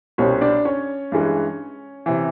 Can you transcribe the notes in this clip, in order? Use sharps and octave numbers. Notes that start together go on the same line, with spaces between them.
C2 B2 G3 C4 C#4 C#5
D4 D5
C#4 C#5
G2 E3 G#3
C3 E3